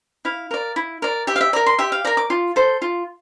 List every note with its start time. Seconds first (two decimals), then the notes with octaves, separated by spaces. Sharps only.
0.25 E4 F5
0.51 A#4 D5
0.76 E4
1.02 A#4 D5
1.27 G4 E5
1.36 F5
1.41 E5
1.53 A#4 D5 A#5
1.66 C6
1.79 G4 E5
1.92 F5
2.05 A#4 D5 A#5
2.17 D6
2.30 F4
2.56 A4 C5
2.82 F4